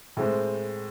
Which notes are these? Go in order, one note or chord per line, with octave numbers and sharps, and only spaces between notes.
A2 G#3 C4